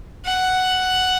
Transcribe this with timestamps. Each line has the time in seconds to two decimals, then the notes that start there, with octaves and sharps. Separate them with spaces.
0.25 F#5